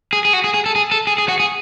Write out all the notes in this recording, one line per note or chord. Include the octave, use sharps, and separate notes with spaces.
G#4
G#4
F#4
G#4
G#4
A4
G#4
A4
G#4
G#4
F#4
G#4